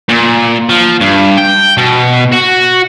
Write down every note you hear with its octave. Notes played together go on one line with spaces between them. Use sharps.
A#2
F3
G2
G5
B2
F#4